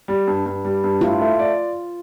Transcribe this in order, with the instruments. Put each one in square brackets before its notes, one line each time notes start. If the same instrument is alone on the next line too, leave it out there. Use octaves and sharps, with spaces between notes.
[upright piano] G3
G2
G2
G3
G2
[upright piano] A2 [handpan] F4
[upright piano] A3
D5